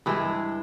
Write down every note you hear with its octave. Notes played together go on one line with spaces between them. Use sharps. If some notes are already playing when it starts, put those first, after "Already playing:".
G2 E3 G#3